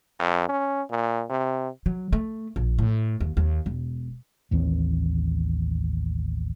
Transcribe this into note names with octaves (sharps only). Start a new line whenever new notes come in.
F2
C#4
A#2
C3
F#3
A3
A#1
A2
D#2
D#2
E1
A1 D#2 E3 C4